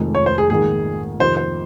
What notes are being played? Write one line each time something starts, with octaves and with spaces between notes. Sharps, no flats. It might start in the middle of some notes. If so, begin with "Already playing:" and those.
Already playing: F1 F2 D#3 G#3
C#5
C5
G#4
A#1 G#2 D#3 G#4
F2 C3 D#3 C5
C5